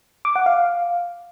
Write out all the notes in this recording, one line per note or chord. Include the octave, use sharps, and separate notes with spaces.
D6
F#5
F5